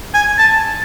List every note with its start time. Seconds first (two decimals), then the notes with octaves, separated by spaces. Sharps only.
0.14 G#5
0.38 A5